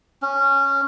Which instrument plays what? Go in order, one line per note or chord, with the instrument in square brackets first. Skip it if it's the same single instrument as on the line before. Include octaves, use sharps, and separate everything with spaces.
[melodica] C#4